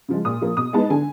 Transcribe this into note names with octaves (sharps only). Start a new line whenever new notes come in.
C#3 F3 G#3
A#2 D#6
F3 A#3
B2 D#6
G#3 B3 D#4 A5
D3 G#5